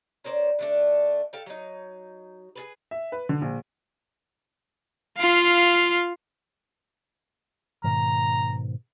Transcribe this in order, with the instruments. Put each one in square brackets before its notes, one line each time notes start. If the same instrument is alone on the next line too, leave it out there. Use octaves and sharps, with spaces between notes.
[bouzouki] C#4 A#4 C5 D5
D3 A3 D4
A4 F5 G5
F#3 D#4
G#4 A4 B4
[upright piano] E5
B4
D3
A#1
[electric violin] F4 F5
[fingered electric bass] G#2 B2 D#3 [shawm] A#5